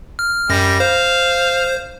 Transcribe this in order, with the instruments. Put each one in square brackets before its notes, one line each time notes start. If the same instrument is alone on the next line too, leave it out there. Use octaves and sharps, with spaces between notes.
[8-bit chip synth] F6
[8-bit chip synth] F#2 A#6 [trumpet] G3
[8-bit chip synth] C5 [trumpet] F5